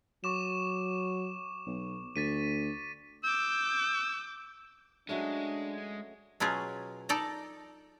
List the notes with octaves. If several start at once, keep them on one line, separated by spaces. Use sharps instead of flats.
F#3 C#6 D6 E7
B1
D2 A6 B6 D#7
D6 E6 G6
F#3 G#3 A3 C#4 D4
B2 F#3 C#4 F4 G#4
D#4 A4 D5 A#5